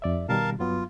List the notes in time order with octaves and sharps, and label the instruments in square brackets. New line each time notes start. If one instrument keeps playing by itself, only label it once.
[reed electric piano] F2 D5 E5
[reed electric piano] B2 D#3 G3 [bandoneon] A#4 F5 A5
[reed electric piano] G2 F#3 B3 [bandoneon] F4